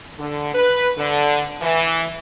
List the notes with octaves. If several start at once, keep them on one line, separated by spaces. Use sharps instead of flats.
D3
B4
D3
E3